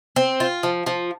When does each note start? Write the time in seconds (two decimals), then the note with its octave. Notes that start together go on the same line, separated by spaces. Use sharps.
0.16 C4
0.40 F4
0.63 F3
0.87 F3